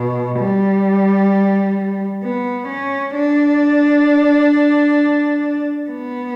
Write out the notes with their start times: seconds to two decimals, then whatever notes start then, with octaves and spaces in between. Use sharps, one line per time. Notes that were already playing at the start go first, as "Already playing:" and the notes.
Already playing: B2
0.40 G3
2.24 B3
2.69 C#4
3.16 D4
5.90 B3